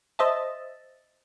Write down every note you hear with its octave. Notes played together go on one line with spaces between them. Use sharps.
C5 D#5 E5 A5